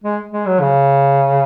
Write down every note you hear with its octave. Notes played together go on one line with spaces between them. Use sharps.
G#3
G#3
F#3
C#3